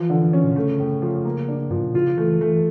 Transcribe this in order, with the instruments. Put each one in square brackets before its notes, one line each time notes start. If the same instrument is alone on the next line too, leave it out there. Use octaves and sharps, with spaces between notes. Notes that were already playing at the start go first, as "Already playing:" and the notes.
Already playing: [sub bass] E3 [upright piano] F3
[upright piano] D3
C#4
[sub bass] A#2
[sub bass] C#3 [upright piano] A3
[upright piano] A2
F3
A#3
D4
[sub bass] G2 [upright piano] F3
[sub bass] A2
A#2
[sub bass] C#3 [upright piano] F4
[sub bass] E3 [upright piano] A3
[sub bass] E3 [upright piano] A3